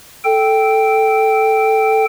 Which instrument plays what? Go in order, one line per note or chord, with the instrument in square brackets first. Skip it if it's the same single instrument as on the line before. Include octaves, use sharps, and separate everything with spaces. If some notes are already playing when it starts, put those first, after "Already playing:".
[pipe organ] A4 G5